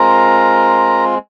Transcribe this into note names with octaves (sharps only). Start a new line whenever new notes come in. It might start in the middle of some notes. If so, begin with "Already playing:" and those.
Already playing: G#3 C4 F4 A#4 A#5